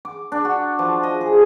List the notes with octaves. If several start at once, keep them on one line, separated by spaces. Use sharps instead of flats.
D6
D4
F#4
F3
D#5
G#4